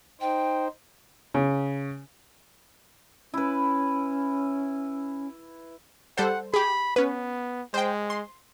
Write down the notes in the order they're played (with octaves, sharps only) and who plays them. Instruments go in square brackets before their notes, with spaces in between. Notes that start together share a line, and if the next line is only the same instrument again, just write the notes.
[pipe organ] D#4 C5 [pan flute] G5
[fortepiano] C#3
[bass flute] C#4 [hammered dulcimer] E4 B4
[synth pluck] G3 A4 C5 [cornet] F#5
[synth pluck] G4 G#4 [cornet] B5
[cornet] B3 [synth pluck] C#4 B4
[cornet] G#3 [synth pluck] C5 G5
[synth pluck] C6